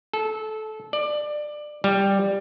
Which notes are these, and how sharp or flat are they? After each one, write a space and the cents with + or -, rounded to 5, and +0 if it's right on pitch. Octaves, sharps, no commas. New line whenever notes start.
A4 -20
D5 +20
G3 +5